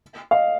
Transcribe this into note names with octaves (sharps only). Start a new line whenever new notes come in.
D#5 F5